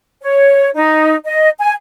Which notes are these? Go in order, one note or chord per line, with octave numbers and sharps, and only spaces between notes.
C#5
D#4
D#5
G#5